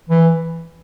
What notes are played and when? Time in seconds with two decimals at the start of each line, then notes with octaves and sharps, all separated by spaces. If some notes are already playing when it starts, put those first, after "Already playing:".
0.10 E3